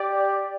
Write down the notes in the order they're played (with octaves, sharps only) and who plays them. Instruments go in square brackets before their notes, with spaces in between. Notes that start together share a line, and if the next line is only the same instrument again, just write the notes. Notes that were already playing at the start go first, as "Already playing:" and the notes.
Already playing: [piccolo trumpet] G4 [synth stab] D5